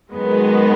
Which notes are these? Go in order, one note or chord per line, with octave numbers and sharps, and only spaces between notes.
F#2 D#3 G#3 B3